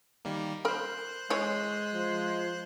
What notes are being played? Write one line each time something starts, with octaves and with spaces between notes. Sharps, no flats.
D#3 G3 A#3
A#4 C5 B5 F#6
E3 G#3 C#5
F3